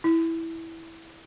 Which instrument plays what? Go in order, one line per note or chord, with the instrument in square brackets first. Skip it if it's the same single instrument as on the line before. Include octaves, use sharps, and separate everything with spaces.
[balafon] E4